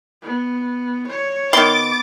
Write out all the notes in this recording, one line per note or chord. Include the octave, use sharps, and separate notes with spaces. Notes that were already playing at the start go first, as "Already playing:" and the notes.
B3
C#5
D#3 B3 C6 D6 A6 D7